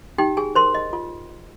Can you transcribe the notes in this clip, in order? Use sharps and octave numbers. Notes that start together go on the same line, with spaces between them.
D#4 G4 G5
G#4 G#5
A#4 C5 C6
D#5
F4